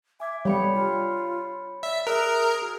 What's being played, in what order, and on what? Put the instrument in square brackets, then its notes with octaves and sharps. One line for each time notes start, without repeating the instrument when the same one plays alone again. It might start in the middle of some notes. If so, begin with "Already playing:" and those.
[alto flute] E5 [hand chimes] G#5 D6 G#6
[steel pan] G3 [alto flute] B3 [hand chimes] C#5 B5 C#7
[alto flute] F4
[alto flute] D5 [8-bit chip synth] E5
[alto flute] G#4 [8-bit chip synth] A#4 [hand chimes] E5 E6 F#6
[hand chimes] F#4